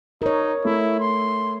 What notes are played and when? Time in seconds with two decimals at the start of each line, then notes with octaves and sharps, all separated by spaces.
0.22 D#4 A#4 C#5
0.65 A3 E4
1.00 C6